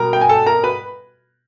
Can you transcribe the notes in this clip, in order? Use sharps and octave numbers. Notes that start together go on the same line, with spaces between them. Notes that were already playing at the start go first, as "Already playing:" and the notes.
Already playing: B2 G3 A#4 A#5
G5
G#5
A4 A5
A#4 A#5
B4 B5